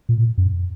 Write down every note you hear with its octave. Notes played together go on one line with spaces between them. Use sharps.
A#2
F#2